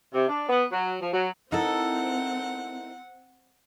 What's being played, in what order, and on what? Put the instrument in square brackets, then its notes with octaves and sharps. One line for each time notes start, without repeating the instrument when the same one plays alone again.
[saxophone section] C3
D4
B3
F#3
F3
F#3
[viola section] C4 [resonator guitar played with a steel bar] D#4 A4 [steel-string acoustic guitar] E4 A#4 E5 [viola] F#5